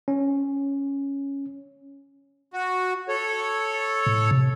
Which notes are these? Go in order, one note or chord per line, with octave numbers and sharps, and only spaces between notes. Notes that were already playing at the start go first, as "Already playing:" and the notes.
C#4
F#4
A4 C#5
A2
C3